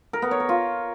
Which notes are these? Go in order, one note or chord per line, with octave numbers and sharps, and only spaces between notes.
A#4
B3
C#5
A#4
F4